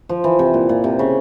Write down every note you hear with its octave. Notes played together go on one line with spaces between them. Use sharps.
F3
E3
C3
A#2
A#2
C3
C#3